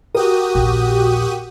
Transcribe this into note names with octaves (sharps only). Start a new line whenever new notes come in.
F#4 G4 A#4 D#6
A#1 D#2